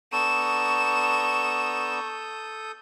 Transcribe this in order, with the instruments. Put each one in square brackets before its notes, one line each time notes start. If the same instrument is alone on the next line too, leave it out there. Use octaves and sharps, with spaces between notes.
[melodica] B3 D4 A#5 [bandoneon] A4 D#6 G6 [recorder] C#6 [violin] E7